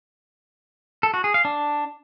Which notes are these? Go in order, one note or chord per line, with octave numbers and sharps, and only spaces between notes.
A4
F#4
G#4
F5
D4